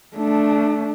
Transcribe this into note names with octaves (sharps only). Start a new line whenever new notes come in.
A3 D4